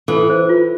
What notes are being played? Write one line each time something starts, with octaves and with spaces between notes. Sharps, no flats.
E3 A4
C5
F4